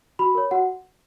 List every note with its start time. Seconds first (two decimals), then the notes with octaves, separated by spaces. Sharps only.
0.19 F#4 B5
0.35 A#4 C#5
0.51 F#4 F#5